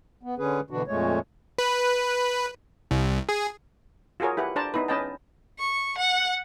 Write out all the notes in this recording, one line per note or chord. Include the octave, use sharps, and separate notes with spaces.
B3
D3 C#4 G#4 B4
B2 D3 E3 D4 F#4
F2 A#2 G#3 A3 C#5
B4
C2
G#4
F4 F#4 G#4 A#4 C#5
E4 G4 B4 F#5
D4 C5 D5 A5 A#5
B3 D#4 E4 B4
C#4 B4 D#5 G5 A5
C#6
F#5